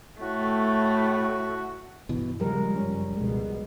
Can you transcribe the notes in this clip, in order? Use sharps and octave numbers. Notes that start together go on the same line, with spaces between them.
A2 A3 F#4
G2 B2 E3
A#2 C#3 F3 G3 G#3 A#4
F#1 F#2 C#4
F1 C#2 B2 G#3